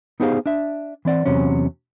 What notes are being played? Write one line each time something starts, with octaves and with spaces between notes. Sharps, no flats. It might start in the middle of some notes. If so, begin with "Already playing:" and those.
B3 D#4 G4 G#4 C5 F5
D4 E5
E3 C4 D5 F#5
E2 C3 F#3 C#4